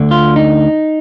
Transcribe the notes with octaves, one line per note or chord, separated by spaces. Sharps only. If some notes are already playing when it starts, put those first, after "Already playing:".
Already playing: D2 D3
F4
D#4